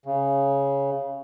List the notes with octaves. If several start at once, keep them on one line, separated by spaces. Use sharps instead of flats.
C#3